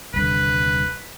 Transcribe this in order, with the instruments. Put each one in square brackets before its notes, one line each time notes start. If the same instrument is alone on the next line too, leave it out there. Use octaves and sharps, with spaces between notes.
[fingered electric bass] D#1 C2 D3 [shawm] B4